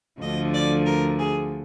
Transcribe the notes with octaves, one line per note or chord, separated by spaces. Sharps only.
D2 D3 F3 D#5
D5
A#4
G#4